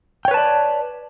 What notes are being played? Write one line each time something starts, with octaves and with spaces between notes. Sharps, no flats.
B4 C#5 D5 G5 A5